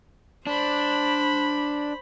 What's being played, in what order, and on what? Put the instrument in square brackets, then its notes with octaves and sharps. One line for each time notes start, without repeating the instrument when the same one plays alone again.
[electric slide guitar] D4 [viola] C5 B5